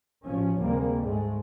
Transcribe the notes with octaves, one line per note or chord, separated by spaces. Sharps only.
A1 F3 C#4
D2 C3 G3 G#3 A#3
G#2 G#3 A3